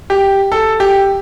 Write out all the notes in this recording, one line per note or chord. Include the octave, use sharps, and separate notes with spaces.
G4
A4
G4